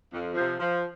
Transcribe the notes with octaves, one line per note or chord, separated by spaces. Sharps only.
F2
C3 F3
F3